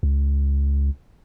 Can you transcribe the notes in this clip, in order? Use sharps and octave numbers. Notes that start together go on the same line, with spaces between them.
C#2